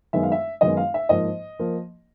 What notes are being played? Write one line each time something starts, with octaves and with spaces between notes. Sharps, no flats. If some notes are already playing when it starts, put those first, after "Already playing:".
F#2 D#3 G#3 B3 E5
F5
E5
F#2 D#3 G#3 B3 D#5
F5
E5
G#2 F3 A#3 D#5
F3 A#3